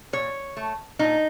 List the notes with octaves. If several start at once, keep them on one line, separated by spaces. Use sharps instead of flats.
A#2 C#5
A3
A#2 D#4